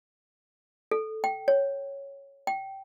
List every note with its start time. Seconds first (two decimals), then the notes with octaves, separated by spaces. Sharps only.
0.91 A4
1.24 G5
1.48 C#5
2.47 G5